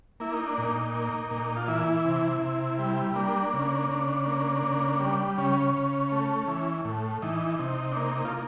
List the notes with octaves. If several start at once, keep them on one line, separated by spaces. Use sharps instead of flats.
A#3 E4
D#4
D4
A#2 D#4
A#3
A#2
F4
E3 E4
C3
C3
G3
A#3 D4
C#3 D4
C#3 D4
A#3
C#3
G3
C#3 C#4
C#3
A3
E3
A2
E3 D#4
C3 D#4
D4
A#3 D#4
F4
A#3